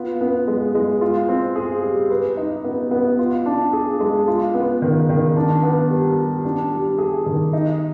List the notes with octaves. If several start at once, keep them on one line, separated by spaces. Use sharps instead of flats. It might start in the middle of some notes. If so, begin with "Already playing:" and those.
Already playing: B3 F4
B3
G#3
G#3
F4
C4
G#4
G3
B4
D#4
B3
B3
F4
D4
G#4
G#3
F4
B3
D#3
D#3
D4
B3
G3
G3
D4
G3
G#4
D#3
D#4